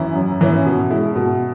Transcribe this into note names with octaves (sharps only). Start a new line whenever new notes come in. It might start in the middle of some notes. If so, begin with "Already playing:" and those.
Already playing: F#2 E3 C#4 E4
F#2
E3 C#4 E4
B2
G#3 E4
B2